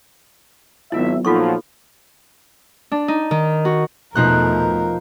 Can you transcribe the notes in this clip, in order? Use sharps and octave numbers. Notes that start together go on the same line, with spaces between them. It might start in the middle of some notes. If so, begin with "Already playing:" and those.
G#1 F#3 B3 E4 F4 E5
A#2 F3 F#3 D#4 F4 A4 C#6
D4
D#4
D#3
F#4
E2 B2 F3 A3 D#4 A#4 F#6